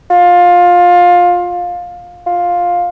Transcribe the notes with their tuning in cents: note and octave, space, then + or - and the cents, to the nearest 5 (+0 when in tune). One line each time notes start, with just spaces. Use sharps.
F4 +20
F4 +10